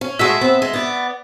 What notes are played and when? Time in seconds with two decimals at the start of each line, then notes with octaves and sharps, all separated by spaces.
0.01 C#4
0.19 G#3 A3 F#4 E5
0.41 B3 C4
0.62 G#3
0.73 B3 D5